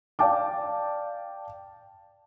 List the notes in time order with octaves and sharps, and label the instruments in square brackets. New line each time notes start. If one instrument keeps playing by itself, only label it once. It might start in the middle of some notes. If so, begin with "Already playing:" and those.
[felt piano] D5 F5 G5 A5 D6